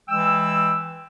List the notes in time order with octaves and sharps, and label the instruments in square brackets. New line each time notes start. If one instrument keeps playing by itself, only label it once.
[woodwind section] E3 G#3 G5 E6